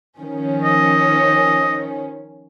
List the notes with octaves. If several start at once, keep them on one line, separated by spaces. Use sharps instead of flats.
D#3 F3 C#4
D#5